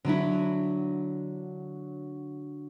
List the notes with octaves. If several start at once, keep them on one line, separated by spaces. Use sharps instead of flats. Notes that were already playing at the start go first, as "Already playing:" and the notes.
D3 F#3 D4 E4